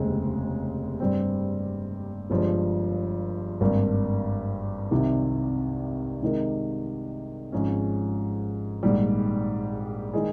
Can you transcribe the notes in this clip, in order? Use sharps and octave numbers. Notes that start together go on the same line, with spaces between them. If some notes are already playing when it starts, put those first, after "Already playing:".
Already playing: F1 D#2 C#3 G#3 C4
G2 G3 C4
G1 G2 F3 G#3
G#1 G2 G3 A#3
C2 C3 D#3
C3 D#3 G#3 D#4 A#4
G#1 G#2 F3 G#3 C#4
A#1 G#2 D#3 G3
D#3 G#3 D#4 G#4